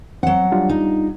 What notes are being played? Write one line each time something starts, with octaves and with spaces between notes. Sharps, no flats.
F#3 C4 F#5
G3 D4 F4
D#4